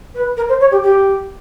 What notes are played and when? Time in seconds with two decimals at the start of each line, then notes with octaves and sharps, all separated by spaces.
0.14 B4
0.37 A#4
0.48 C5
0.60 C#5
0.71 G4
0.83 G4